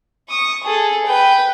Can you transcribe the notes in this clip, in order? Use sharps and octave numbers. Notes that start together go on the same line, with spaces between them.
C#6 D#6
G#4 A4
B4 G5